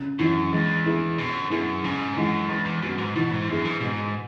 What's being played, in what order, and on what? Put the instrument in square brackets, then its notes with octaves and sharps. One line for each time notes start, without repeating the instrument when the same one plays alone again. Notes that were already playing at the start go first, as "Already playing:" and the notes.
Already playing: [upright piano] C#3
[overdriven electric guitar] F#2 [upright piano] E3 C#4 E4
[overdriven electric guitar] E2 [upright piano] G#3
[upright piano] B3 E4 G#4
[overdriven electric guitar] F#2 [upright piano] B2
[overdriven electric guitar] F#2 [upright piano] B3 E4 G#4
[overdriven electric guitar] G#2 [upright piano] C#3
[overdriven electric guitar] F#2 [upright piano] E3 G#3
[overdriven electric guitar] E2 [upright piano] G#3
[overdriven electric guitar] E2
[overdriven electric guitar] F#2 [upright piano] B3 F#4
[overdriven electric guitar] G#2
[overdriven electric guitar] B2 [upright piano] E3
[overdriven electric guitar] G#2
[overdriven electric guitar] F#2 [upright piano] B3 E4 G#4
[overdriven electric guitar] G#2
[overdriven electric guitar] G#2 [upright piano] B2